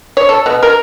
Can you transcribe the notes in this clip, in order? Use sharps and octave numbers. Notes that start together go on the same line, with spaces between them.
C#5
A4
B2
A#4